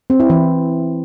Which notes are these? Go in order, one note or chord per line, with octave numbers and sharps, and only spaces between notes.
C4
E4
E3